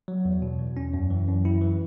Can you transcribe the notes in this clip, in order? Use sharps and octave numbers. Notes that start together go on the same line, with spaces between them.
F#3
E2
B2
E2
C#4
F#2
E3
F#2
E4
E3